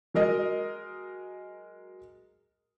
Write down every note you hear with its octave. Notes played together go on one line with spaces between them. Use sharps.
F#3 G#3 A#4 D#5